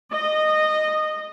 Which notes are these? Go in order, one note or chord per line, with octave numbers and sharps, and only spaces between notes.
D#5